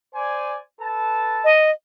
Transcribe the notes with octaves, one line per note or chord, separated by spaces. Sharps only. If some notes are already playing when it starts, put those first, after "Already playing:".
C5 D5 G#5
A4 B4 A5
D#5